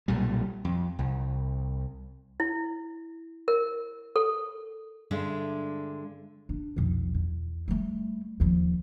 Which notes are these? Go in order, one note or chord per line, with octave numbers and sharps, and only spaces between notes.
B1 A#2 G3
F2
C2
E4
A#4
A4
G2 D3 G#3 D4 E5
D4
B1 F2
E2
G3 A3
D#2 F3